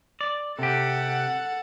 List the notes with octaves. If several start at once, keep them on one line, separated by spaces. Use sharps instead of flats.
D5
C3 G4 A4 F#5